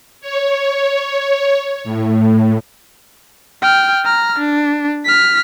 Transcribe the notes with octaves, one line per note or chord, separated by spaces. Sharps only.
C#5
A2
G5 F6
A#5 F6
D4
F6 B6